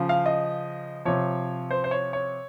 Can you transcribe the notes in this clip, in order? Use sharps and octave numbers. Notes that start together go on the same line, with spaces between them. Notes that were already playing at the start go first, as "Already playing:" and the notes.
Already playing: C#3 F3
F5
D#5
C3 F3 C#5
C5
C5
C#5
C#5